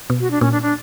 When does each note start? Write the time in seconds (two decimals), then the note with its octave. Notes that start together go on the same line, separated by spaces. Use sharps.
0.10 B2
0.20 F#4
0.31 D4
0.41 A#2 C#4
0.52 D4
0.62 D4